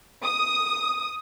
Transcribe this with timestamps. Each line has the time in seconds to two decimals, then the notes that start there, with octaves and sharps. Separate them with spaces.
0.24 D#6